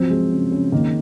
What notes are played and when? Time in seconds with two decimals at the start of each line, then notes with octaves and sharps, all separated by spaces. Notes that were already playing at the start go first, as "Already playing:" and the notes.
Already playing: F3 F#3 C4
0.10 G#3
0.31 C#3
0.51 C#3
0.72 D#3 A#3